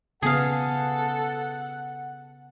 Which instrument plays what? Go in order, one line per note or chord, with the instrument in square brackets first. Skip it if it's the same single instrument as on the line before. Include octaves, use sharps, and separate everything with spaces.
[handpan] C#3 B3 [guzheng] G#4 F5 [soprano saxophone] A4 [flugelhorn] F#5